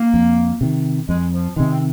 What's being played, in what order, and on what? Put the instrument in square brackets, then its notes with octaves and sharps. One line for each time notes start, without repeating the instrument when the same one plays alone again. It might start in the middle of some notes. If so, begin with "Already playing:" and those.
Already playing: [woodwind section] A#3
[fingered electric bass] F2
C3 D#3
[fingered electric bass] F2 [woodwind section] G#3
[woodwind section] F3
[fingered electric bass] C3 D#3 [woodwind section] G#3
[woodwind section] C4